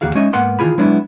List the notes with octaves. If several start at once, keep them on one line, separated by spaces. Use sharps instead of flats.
D#2 C#3 E3 F#4 G#4 F5
G#3 C#4 D#4 D#5 E5
G#2 A#3 B3 F#5 C6
D#3 E3 F4 G#4 B5
F#3 G#3 B3 D4 E4